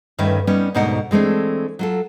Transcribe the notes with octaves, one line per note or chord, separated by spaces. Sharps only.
D2 G2 D#3 C#4 B4 E5
G3 B3 C#4 D#4
D2 G#2 B2 D#4 A#4 F#5
E3 G#3 A3 C4 D4
F#3 F4 A4